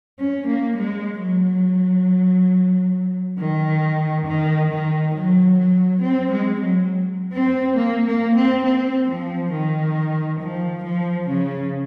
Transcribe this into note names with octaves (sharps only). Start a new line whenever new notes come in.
C#4
A#3
G#3
F#3
D#3
D#3
D#3
F#3
F#3
C4
G#3
F#3
C4
A#3
A#3
C4
C4
F3
D#3
F3
F3
C#3